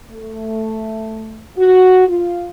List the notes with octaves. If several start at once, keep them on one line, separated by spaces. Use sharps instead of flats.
A3
F#4
F4